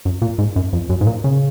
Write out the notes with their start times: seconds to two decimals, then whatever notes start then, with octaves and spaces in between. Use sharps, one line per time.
0.05 F#2
0.22 A#2
0.38 G#2
0.56 F#2
0.73 F2
0.89 F#2
1.01 G#2
1.07 A#2
1.24 C#3